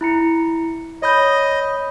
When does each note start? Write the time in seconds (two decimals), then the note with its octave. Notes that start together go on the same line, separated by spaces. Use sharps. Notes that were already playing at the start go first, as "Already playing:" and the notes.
0.01 E4 A#5 C#7
1.02 C#5 D#5 B5 G6